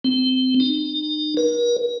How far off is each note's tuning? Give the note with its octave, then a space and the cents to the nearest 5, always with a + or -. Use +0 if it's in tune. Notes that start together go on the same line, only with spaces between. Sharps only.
C4 -20
D#4 -40
A#4 +45